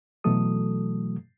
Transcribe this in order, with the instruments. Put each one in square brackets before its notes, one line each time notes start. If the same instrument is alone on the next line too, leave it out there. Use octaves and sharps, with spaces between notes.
[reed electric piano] B2 E3 F#3 A3 A4 D#6